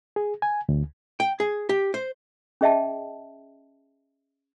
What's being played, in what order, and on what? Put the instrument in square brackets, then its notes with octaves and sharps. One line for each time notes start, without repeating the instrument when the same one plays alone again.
[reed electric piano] G#4
G#5
D2
[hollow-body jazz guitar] G5
G#4
G4
C5
[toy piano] C#4 G#4 D#5 E5 G5 A5